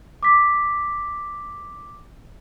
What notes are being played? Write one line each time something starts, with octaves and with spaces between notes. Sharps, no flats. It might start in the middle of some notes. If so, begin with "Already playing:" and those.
D6 B6